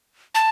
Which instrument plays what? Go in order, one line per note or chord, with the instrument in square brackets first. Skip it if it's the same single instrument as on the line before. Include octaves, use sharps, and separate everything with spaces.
[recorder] A5